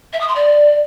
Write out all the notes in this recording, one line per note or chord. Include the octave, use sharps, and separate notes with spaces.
E5
D#6
C6
D5